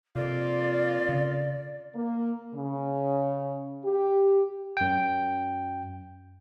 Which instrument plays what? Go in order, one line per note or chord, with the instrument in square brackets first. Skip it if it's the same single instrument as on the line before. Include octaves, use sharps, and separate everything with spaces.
[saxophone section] F2 A#3 F4 [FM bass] C3 [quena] D5
[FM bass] C#3
[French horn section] A#3
C#3
G4
[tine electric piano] F#2 G5